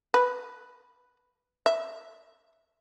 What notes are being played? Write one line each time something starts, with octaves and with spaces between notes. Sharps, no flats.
B4
E5